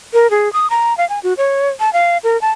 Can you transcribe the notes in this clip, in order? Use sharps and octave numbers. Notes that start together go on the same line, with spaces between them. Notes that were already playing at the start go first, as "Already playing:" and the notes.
A#4
G#4
D#6
A#5
F5
G#5
F#4
C#5
A5
F5
A#4
A5